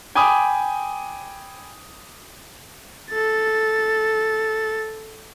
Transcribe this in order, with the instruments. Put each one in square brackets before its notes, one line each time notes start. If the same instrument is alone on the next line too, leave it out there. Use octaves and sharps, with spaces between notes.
[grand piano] G5 G#5 B5 D6 D#6
[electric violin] A4 A6